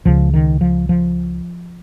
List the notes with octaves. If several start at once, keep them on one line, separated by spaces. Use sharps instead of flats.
C#2 C#3 F3
D#3
F3
F3